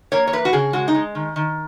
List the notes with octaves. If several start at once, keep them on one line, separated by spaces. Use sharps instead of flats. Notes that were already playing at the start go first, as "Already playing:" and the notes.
A#3 C#5
C#5
E3 B4
F#4
C#3 G#4
G#3 F#4
D#4
G#3
D#3
D#3